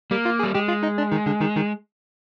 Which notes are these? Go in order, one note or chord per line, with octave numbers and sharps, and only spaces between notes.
G3 A#3 G4
F4 F5
G#4 G#5
G3
G#3 G4 G5
F4 F5
D#4 D#5
D4 D5
D#3 D#4
D3 D4
D#3 D#4
D#3 D#4